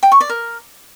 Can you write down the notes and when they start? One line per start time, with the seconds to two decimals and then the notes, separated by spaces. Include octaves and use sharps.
0.03 G5
0.12 C#6
0.21 D5
0.29 A#4